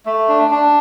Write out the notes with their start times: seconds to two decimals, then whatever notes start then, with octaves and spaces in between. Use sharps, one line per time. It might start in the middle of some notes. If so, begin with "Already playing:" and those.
0.06 A3
0.28 D4
0.51 D4